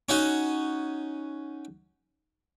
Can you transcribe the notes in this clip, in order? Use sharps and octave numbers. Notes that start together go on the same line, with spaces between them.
C#4 D#4 F#4